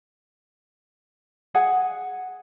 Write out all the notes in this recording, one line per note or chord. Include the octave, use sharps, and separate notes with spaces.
G#4 F#5 G#5